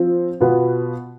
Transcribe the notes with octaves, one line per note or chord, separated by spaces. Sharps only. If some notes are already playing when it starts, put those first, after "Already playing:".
Already playing: F3 C4 F4
B2 B3 F4